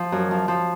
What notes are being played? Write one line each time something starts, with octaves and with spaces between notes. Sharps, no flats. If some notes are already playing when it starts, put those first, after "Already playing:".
Already playing: F3
F#2
F3
F3